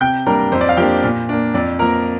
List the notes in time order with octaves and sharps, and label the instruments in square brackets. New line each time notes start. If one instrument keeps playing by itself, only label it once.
[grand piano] C3 G5 G6
G3 A#3 D4 A#4 A#5
F2 C5
D5
F5
F3 A#3 D4 G4 G5
A#2
A#3 D4
F2 D5
F3 A#3 A#4 A#5